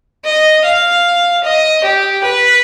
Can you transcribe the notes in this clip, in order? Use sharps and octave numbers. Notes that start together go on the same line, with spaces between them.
D#5
F5
D#5
G4
B4